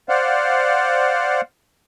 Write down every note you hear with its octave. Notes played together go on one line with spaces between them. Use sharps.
C5 D5 F5 F#5